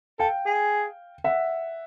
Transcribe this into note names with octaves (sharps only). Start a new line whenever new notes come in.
A4 F5 G5
G#4
E5 F#5